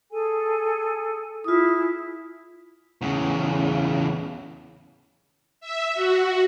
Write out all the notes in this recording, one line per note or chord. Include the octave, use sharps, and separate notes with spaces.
G#4 A4 G#5
E4 F4 G#4 D#6
E2 C#3
E5
F#4